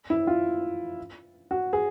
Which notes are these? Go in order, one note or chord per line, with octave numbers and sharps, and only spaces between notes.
E4
F4
F#4
G#4